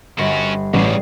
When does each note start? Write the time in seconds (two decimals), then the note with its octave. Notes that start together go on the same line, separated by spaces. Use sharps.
0.19 G1 C#4 F#4
0.74 A1 G#2 C#3 G3 C7